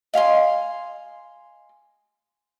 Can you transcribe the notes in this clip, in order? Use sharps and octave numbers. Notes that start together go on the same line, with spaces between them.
D#5 F5 G#5 C6